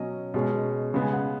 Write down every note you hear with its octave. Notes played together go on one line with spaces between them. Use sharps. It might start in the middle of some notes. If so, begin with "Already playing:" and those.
Already playing: B2 F#3 C#4 D#5
B2 G#3 C#4
C#3 G#3 B3
G#5
F#5